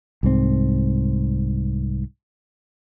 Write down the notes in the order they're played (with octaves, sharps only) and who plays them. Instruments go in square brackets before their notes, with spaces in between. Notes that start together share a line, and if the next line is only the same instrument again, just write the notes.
[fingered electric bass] C2 G#2 C4